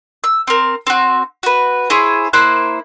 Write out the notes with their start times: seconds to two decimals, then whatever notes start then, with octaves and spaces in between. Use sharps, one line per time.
0.24 E6
0.47 C4 A#4
0.87 C4 F#4
1.43 F#4 B4
1.90 E4 G#4 C5 C#5
2.33 A#3 E4 C5 F#6